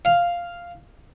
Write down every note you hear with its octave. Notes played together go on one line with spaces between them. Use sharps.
F5